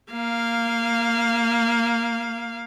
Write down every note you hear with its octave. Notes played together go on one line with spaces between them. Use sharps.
A#3 F5